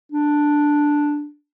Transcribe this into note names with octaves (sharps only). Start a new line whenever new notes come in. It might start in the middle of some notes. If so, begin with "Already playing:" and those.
D4